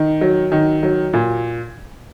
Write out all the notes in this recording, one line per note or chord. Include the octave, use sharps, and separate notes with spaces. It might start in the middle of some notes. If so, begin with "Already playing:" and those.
Already playing: D#3
F#3
D#3
F#3
A#2